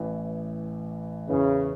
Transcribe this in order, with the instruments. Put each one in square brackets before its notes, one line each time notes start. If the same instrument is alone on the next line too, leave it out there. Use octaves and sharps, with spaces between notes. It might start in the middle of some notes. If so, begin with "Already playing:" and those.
Already playing: [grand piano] A1 A2 E3
[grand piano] E2 E3 C#4 E4 B4 [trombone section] C#3